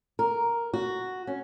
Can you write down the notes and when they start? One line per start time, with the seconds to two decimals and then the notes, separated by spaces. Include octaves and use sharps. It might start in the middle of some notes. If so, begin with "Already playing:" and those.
0.19 A#4
0.74 F#4
1.27 C#4